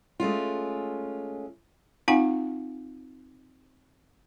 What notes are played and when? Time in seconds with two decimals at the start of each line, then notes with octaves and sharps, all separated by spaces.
0.20 G#3 A3 C#4 F4
2.08 C4 D#4 F4 F5 F#5 G#5